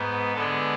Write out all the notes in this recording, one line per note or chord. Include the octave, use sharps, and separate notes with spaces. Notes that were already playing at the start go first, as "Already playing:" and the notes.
Already playing: G#2 G#3 B3
D3 G#3 B3 D4 A4